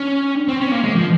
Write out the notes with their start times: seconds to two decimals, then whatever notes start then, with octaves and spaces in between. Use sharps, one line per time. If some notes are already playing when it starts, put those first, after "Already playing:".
Already playing: C#4
0.48 C4
0.60 C#4
0.71 A#3
0.84 G#3
0.95 F3